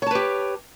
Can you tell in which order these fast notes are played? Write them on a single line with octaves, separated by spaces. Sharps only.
C#5 A5 B4 G4